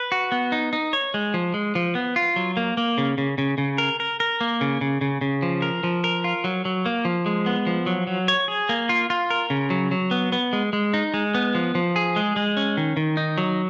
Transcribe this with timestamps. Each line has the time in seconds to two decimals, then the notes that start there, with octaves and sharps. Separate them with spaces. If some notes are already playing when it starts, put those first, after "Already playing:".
Already playing: B4
0.12 F#4
0.32 B3
0.52 D#4
0.73 D#4
0.93 C#5
1.14 G#3
1.34 F3
1.54 G#3
1.75 F3
1.95 B3
2.16 F4
2.36 F#3
2.57 A#3
2.77 A#3
2.98 C#3
3.18 C#3
3.38 C#3
3.58 C#3
3.78 A#4
4.00 A#4
4.20 A#4
4.41 A#3
4.61 C#3
4.81 C#3
5.01 C#3
5.21 C#3
5.43 F3
5.62 A#4
5.83 F3
6.04 A#4
6.24 F4
6.44 F#3
6.65 F#3
6.86 A#3
7.05 F3
7.26 G#3
7.46 B3
7.67 F3
7.86 F#3
8.07 F#3
8.28 C#5
8.48 G#4
8.69 A#3
8.89 F4
9.10 F4
9.30 A#4
9.50 C#3
9.70 F#3
9.91 F#3
10.11 B3
10.32 B3
10.53 G#3
10.73 G#3
10.94 D#4
11.14 G#3
11.35 B3
11.55 F3
11.75 F3
11.96 G#4
12.16 G#3
12.36 G#3
12.57 C#4
12.77 D#3
12.97 D#3
13.17 D#4
13.38 F#3